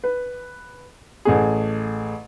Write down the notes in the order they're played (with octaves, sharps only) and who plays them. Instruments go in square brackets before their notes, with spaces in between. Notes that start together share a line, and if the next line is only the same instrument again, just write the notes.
[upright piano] B4
A1 A3 G#4